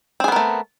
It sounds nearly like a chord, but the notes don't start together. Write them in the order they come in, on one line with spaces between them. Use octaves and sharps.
C4 G#4 B3 A#4 A3